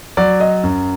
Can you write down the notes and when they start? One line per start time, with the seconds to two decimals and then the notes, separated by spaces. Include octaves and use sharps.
0.17 F#3 D5
0.40 D#5
0.64 F#2